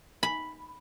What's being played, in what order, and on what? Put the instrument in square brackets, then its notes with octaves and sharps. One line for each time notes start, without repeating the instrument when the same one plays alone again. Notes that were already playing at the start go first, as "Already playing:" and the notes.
[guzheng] B5